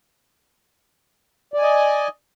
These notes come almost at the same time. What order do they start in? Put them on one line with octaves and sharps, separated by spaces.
D5 G#5 D#5